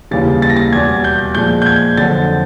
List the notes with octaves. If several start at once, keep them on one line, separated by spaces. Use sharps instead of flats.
D#2 C#3 E3 G3 A6
A6
A#6
A6
E2 B2 G3 G#6
G6
A#2 F3 G#3 G6
G6
G#6
F2 D3 F#3 A6